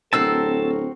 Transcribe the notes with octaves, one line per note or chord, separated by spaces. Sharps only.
D1 C4 F#4 A4 A#4 A5 E6